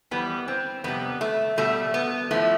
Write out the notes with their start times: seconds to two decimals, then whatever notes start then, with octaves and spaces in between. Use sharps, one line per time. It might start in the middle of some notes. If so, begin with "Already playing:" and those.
0.11 F2 E3 G3 B3
0.48 C4
0.84 F2 C3 G3 B3
1.21 A3
1.58 B2 G3 A3
1.94 B3
2.31 A2 F3 A3